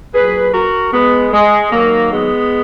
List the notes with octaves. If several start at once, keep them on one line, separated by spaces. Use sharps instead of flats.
A#2 F#3 G#4 B4
F#4 A#4
G#3 B3
G#3
G#2 D#3 F#3 A#3
G#3 B3